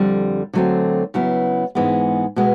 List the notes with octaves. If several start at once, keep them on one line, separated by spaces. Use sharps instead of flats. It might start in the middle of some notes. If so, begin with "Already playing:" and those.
Already playing: F2 D3 G3
D3 F#3 A3 C4
C#3 F#3 B3 E4
G#2 E3 G#3 B3
B2 G#3 B3